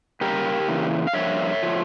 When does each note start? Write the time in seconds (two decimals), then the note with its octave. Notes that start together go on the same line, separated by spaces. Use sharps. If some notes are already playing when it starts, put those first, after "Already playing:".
0.21 C#3 G3 A#3 G4 A#4
0.68 C#3 E3 A#3
1.07 F5
1.13 G2 F3 A#3 C#5 E5
1.63 F3 A3